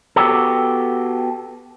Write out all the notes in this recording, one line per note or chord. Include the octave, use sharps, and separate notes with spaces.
B3 F#4 G4 A4